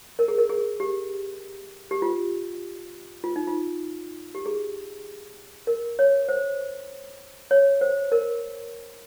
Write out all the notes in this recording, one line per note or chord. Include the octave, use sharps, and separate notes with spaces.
A#4
G#4
A#4
G#4
G4
G4
F4
F4
D#4
F4
G4
G#4
A#4
C#5
C5
C#5
C5
A#4